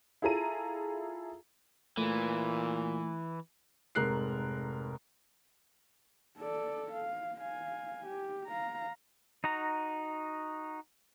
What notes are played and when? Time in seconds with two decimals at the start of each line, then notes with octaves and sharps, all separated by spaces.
0.22 E4 F4 G#4 A4 A#5 D#7
1.97 A#2 E3 A3
3.95 F1 G#2 A#4 F#6 C7
6.39 A4 D5
6.92 F5
7.40 F5 G#5
8.06 G4
8.47 F5 A#5
9.44 D#4 F#4 A#5